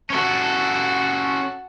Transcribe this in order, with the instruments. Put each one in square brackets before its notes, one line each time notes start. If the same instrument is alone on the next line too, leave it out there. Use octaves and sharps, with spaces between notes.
[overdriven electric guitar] C#4 A4 [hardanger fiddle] F#4 A5